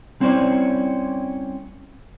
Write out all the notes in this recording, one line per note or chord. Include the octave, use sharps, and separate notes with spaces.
G3 C4 C#4 E4 C5 D5